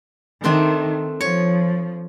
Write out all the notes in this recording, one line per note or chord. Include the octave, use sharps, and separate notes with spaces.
D#3 A3 C4 D4
F3 C#5